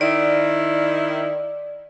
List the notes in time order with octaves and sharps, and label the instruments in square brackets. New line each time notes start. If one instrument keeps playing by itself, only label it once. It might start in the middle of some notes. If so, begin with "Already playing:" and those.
[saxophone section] D#3 E4 [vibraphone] D5